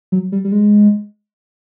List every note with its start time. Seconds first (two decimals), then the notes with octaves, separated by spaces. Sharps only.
0.12 F#3
0.32 G3
0.44 G3
0.52 G#3